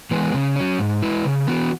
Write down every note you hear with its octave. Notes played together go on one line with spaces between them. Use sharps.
E3 G#3 B3 G#4
C#3
F#3 C#4
G#2
G#3 E4 B4
C#3
E3 B3 F#4